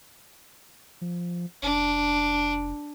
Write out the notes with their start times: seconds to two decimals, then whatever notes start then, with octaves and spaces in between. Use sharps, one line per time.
1.01 F3
1.63 F1 D4